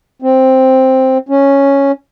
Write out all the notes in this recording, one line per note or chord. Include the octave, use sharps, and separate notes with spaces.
C4
C#4